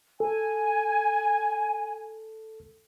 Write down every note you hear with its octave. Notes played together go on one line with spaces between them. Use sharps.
A4 G#5